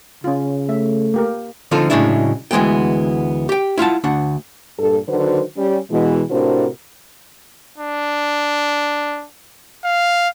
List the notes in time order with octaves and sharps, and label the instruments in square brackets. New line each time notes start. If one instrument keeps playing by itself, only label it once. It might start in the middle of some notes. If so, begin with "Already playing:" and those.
[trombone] C#3 [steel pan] C#4 F4
[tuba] A3 [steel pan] E5
[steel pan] A#3 G4 A#4
[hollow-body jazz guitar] D3 F3 C4 D#4 F4 A4
A2 C#3 F#3 G#3 D4 E4
D2 E3 G#3 B3 G5
G4 G5
E4 F4 F#5 A5
D2 D4 F#5
[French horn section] G2 A#2 A4
D3 D#3 F#3 F#4 B4 C5
G3 C#4
B2 E3 G#3
A2 C3 D4 F#4 A#4 C5
[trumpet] D4
F5